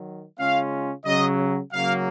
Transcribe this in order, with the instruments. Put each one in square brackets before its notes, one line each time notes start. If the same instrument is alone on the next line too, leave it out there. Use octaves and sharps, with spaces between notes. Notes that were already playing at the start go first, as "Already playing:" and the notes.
Already playing: [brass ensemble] D#3 F#3
C#3 G#3 C#4 F4 F5
C#3 F#3 C#4 D#5
C#3 F#3 A#3 F5